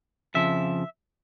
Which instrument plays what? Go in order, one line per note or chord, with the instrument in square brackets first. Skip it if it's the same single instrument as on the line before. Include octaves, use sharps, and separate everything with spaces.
[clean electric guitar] F2 C#3 F3 E5